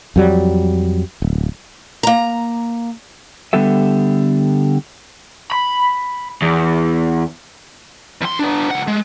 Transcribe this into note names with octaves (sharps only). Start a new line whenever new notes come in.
F2 F#3 G3
D1
A#3 A#5
D3 G3 B3 G4 A4 E5
B5
E2
E2 C6
B3 D4
C#2 F#5
G#3